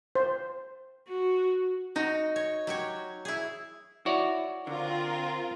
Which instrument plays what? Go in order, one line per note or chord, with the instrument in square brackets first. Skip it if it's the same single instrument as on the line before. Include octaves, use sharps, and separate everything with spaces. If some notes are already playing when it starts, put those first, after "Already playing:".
[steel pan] C5
[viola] F#4
[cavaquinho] D#4 [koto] F#4
[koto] C#5
F#3 G4 C#5
E4 G#4
[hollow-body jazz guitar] E4 [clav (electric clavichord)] F#4 C#5 D5
[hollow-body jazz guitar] D3 [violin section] C4 F4 A#4